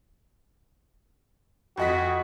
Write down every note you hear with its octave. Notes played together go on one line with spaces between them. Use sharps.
F2 F#4 D#5 B6